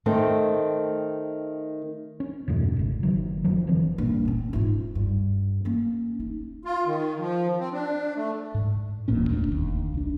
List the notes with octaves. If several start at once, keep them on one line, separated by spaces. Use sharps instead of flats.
D#3 A3 C4
C#4
E2 G2 B2 A3
G#1 C#3
F#1 D#3 F#3
F#2 D#3 F3 F#3
F1 D3 E3 C4
A#1 G2
C4 C#4
G#2 F4
G2
A#3 C#4
D#4
F4
D#3
F3
C4
D4
A3
G#2
D1 A1 A#2 C#4
E2 A3 A#3 D4
F1 D#2
C2 D4